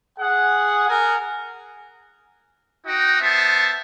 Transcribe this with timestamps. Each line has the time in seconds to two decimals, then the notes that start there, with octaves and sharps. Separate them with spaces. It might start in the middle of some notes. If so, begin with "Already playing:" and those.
0.19 G#4 F#5
0.89 G#4 A#4 F#5 G#5
2.86 D#4 F#4 D#5 G5
3.20 B3 C5 E5 A5